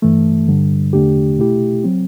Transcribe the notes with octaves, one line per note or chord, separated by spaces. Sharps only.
G2 E3 A3
G2 D3 G3
E2 D3 A3 D4 G4
B2 A3 E4 G4
F#3 C4